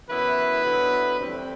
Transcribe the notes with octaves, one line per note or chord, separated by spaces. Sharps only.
F#2 E3 B3 E4 B4
D3 F#3 B3 E4
A2 E3 G3 C4